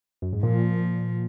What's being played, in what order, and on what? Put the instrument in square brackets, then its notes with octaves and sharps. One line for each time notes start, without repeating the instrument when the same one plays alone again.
[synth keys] F#2
G#2
[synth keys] A#2 [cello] F3